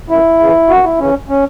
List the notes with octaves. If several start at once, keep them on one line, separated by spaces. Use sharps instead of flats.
F#2 E4
C#3 E3
F#2 F#4
E4
C#3 E3 C#4
C#4